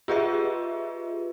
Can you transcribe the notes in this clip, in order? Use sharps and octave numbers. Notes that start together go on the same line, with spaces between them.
F4 G4 G#4 B4 D#5 E5